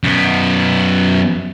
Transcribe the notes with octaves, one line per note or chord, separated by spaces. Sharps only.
F#2 B3